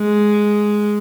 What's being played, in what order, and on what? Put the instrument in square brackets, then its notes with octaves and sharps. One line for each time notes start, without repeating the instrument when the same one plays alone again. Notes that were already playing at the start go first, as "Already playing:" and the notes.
Already playing: [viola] G#3